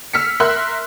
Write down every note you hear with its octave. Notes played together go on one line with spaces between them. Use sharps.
E6 F6 B6 C#7
A#4 E5 C6 E6 F#6